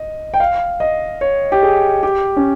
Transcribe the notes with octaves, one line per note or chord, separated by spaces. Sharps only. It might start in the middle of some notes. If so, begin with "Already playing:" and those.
Already playing: D#5
G5
F5
D#5
C#5
G4
G#4
G4
C#4